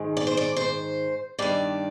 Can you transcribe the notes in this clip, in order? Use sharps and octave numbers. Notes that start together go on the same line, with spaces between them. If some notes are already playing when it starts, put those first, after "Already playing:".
Already playing: G#2 D#3
D5
C5
D5
C5
G2 D#3 D5